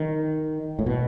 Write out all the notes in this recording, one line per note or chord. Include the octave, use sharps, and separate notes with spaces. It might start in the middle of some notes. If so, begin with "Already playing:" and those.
Already playing: D#3
A2
B2